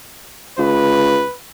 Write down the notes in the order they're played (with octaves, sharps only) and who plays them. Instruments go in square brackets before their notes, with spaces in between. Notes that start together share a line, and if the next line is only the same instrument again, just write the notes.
[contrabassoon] C#2 [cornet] B4